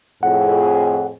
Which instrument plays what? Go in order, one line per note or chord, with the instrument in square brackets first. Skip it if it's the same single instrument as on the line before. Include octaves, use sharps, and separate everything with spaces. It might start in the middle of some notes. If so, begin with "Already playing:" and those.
[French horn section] F2 A2 G#4 [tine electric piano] F#5